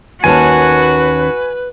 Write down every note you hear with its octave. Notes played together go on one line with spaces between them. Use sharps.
D#2 C#4 F#4 B4 G#5 A5